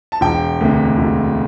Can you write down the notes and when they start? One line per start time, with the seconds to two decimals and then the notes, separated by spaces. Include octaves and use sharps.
0.12 A5
0.21 E1 G5
0.60 D2 C3
0.98 E1